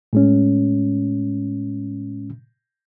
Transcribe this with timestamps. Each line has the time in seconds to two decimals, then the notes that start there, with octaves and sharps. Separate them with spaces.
0.13 A2 G#3 C#4